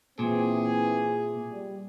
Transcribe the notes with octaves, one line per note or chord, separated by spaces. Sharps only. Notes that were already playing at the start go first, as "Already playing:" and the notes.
A#2 E3 C4 G#4
G3